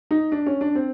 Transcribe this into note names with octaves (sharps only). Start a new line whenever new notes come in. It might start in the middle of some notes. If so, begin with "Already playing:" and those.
D#4
D4
C#4
D4
C4